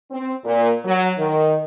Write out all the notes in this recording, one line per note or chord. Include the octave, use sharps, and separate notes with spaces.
C4
A#2
F#3
D#3